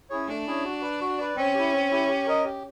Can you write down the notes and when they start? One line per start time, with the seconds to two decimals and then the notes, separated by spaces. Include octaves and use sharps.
0.10 C#4 E4 G#4 C#5
0.27 A3 D4
0.46 C#4 E4 G#4 C#5
0.65 F#4
0.82 B4 D5
1.01 F#4
1.18 B4 D5
1.36 C4 C#4
1.55 E4 G4
1.73 C4
1.91 E4 G4
2.09 G4
2.27 A#4 D#5
2.45 G4